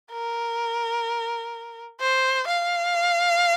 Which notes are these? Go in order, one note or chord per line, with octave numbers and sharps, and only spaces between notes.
A#4
C5
F5